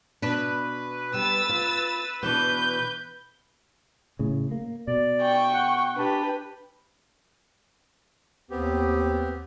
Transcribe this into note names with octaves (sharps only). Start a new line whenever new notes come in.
B2 D4 B4
G3 E6 A6
F4
B2 E3 D4 G6
A2 C#3
A#3
B2 D5
G5 C#6
F#5
D4 G4 B4
D#2 B3 C4 G4